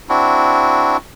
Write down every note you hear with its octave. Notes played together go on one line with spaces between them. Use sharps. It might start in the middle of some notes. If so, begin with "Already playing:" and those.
C4 D4 E4 F#4